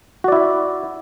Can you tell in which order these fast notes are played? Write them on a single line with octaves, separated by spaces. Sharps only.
F#4 D5 E4 E5